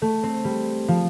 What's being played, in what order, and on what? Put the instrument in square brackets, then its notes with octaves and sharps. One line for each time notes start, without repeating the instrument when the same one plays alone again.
[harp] A3
C4
G3
F3